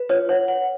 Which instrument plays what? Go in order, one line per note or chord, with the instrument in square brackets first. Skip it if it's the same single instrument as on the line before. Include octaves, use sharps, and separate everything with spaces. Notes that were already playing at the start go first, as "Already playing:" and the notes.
Already playing: [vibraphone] B4
[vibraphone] F4 [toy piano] C#5
[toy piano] C#5 [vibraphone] F#5
[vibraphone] F#5